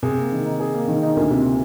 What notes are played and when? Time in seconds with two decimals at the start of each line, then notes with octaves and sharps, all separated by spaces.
0.03 C3 G#4
0.17 A#3
0.32 D#3
0.45 D#4
0.60 G#4
0.74 A#3
0.88 D#3
1.02 D#4
1.16 D2 A#2
1.30 C3